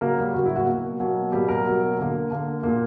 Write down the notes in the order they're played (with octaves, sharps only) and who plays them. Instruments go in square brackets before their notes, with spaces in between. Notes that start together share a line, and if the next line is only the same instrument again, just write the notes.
[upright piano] C#3 F#3 A#3 A#4
G3 G4
C#3 F#3 A#3 F#4
E4
F#4
B2 F#3 A#3
B2 F#3 A#3
B2 F#3 G3 A#3 G4
A#3 A#4
B2 F#3 A#3
D3 A#3
D3 A#3
A#2 A#3